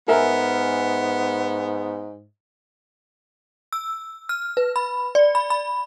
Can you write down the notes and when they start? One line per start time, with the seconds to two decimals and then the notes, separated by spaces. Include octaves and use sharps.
0.08 G#2 B3 A#4 E5 G#5
3.73 E6
4.29 F6
4.57 B4
4.76 B5
5.15 D5
5.35 B5
5.50 B5